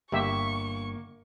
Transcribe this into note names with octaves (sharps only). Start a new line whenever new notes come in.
G1 A#3 G4 E5 C#6